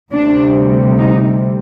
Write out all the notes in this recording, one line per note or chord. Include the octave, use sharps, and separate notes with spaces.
D2 C3 G3 D4
D#4